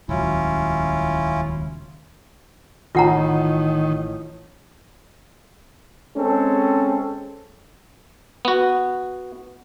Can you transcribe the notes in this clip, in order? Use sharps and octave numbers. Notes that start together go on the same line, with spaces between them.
D#1 C#2 F#3 C#4 E4 F4
A1 D#3 F4 F#5 A#5
G#3 C4 C#4 A4
B3 F#4